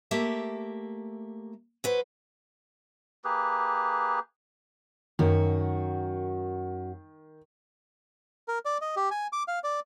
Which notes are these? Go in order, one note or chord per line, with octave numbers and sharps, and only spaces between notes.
A3 A#3 G4 E5
F#3 B4 C5
A#3 G4 G#4 B4
F#2 D#3 F#4
A#4
D5
D#5
G4
G#5
D6
F5
D5